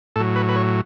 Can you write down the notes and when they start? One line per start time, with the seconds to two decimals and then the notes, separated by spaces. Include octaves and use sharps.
0.16 A2 F#3 A4
0.36 B4
0.49 B4
0.56 C#5